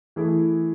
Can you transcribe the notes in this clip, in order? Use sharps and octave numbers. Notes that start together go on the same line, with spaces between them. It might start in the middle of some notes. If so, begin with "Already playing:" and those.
E3 A3 E4 G#4